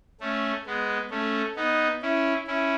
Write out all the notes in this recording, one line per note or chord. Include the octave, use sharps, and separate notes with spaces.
A3 C#4
G#3 B3
A3 C#4
B3 D#4
C#4 E4
C#4 E4